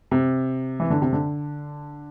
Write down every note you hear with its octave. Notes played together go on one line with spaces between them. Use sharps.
C3
E3
D3
C3
D3